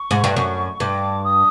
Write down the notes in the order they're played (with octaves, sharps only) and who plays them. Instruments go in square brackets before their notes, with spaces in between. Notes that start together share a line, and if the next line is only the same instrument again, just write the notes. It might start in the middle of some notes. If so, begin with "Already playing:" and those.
Already playing: [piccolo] C#6
[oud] G#2
G2
F#2
[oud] G2 [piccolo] D6
[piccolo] D#6